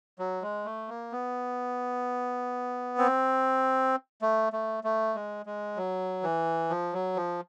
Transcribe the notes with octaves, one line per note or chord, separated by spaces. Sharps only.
F#3
G#3
A3
A#3
B3
C4
A3
A3
A3
G#3
G#3
F#3
E3
F3
F#3
F3